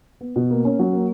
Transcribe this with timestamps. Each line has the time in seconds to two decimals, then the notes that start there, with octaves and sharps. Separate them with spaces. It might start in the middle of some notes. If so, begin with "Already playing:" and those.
0.21 B3
0.36 B2
0.51 A#3
0.65 C#4
0.79 F#3
0.93 A#3